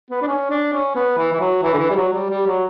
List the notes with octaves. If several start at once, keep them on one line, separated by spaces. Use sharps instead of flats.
B3
D4
C#4
D4
C#4
B3
E3
E3
F#3
E3
D3
E3
G3
F#3
G3
G3
F#3